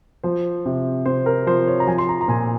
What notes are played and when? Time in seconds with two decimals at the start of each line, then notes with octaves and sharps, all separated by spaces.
0.23 F3 C5
0.66 C3
1.06 C3 C5
1.26 A#4
1.47 F3 C5
1.67 C#5
1.80 A#5
1.87 F3 G#5
1.98 C6
2.09 A#5
2.21 A#5
2.28 A#2 G#5